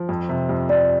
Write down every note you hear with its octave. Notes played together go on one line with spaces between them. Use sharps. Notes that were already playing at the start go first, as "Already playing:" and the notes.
Already playing: F3
F2
C3
F2
F2 D5